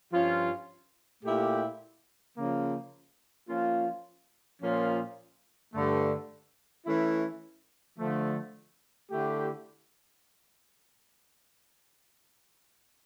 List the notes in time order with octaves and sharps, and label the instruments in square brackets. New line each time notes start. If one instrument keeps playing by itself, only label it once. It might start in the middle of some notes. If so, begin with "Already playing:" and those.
[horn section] G2 F3 C#4 F4
A#2 A3 E4 G4
C#3 F3 A#3
F3 A#3 C#4 F4
A#2 F3 A#3 C#4 F4
G2 D3 A3
E3 A3 C#4 E4
D3 F3 A3
D3 A3 E4 G4